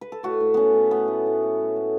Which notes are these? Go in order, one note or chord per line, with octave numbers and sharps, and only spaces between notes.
B4
A4
A2 F#4
A2
A3 B3 C#4
A2
A3 B3
A2
A2
A3
A3
A3